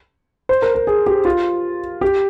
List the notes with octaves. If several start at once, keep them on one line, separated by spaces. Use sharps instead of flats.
C5
A#4
A#4
G#4
G4
F4
G4